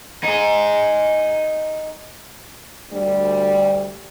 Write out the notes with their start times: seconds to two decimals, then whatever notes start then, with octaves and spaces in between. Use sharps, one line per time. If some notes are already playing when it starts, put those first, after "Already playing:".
0.24 D#4 G#4
2.90 D2 G3